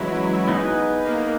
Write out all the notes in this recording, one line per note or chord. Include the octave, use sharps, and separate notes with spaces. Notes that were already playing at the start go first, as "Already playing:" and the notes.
Already playing: E3 F#3 G#3 C#4 E4
B3 D#4 G#4 B4
A#3